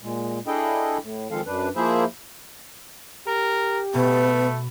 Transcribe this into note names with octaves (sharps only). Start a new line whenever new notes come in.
A#2 G#3
D4 E4 G#4 A4 D#5 G5
A2
D#3 F3 G#3 C4 A4 F5
F#2 D4 B4
F3 A#3 E4 G#4 C5 E5
G4 A#4
B2 A3 B3